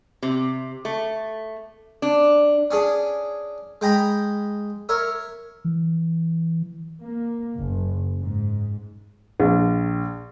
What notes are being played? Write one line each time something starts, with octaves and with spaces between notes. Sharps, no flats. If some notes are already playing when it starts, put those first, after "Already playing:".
C3
A3
D4
C#4 D4 G#4
G#3 G5 A#5 B5
A#4 C#5 E5
E3
A#3
F#1
G#2
A#1